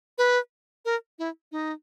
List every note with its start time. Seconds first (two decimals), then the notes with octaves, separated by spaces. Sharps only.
0.18 B4
0.85 A#4
1.19 E4
1.52 D#4